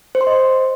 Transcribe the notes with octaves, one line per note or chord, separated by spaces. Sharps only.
C5
C6
D#5